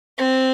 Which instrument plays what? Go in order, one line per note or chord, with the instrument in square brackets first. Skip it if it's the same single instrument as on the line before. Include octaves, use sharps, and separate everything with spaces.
[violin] C4